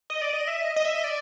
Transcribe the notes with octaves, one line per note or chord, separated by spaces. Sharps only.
D#5
D5
D#5
E5
D#5
D#5
E5
D#5
D5